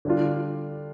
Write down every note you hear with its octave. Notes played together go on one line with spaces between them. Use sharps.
D3 G3 D4 F4